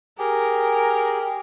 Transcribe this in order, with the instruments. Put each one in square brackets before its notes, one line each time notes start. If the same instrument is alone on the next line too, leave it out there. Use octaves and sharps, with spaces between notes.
[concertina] G4 G#4 [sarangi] A#4